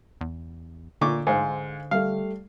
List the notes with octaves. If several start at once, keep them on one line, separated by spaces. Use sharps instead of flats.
E2
A#2 D3 C#6 D6
G#2 C5 F5 G#5
G3 A3 F5